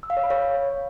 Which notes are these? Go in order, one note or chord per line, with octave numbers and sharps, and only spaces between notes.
E6
F5
C#5
B5
C#5